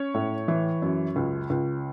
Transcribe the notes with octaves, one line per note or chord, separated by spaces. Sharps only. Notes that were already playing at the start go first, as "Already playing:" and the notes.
Already playing: C#4 C#5
A2
E3
F#2
C#2
C#2